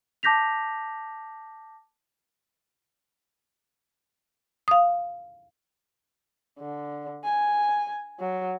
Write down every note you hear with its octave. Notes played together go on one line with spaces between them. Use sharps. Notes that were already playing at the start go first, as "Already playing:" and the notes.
A5 D6 G6 A#6 B6 F7
F5 D#6
D3
G#5
F#3